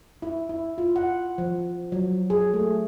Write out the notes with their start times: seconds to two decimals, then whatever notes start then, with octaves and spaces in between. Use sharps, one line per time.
0.22 E4
0.49 E4
0.78 F4
0.96 F#5
1.38 F3
1.92 F#3
2.30 G#4
2.54 A3